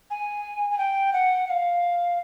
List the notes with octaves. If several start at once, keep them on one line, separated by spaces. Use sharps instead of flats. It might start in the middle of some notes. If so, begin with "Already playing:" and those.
G#5
G#5
G5
F#5
F#5
F5